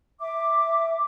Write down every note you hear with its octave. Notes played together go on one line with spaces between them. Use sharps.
E5 D6